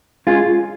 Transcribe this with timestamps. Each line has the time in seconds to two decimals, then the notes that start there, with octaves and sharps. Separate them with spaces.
0.27 G#3 C#4 F4 G#4